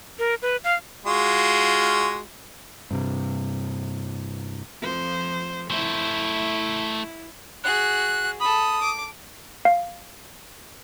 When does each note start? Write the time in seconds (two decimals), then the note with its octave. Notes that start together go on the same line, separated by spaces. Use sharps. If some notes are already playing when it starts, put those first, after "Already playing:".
0.19 A#4
0.42 B4
0.64 F5
1.06 G#3 F4 F#4
2.91 G2 C3
4.82 F2 F3 C5
5.70 A3 E4 C5
7.64 F#4 G#4 F#6
8.40 A4 B5 D#6
8.82 D6
9.65 F5